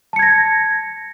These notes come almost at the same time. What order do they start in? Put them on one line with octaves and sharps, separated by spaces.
A5 C#7 G#6 A#6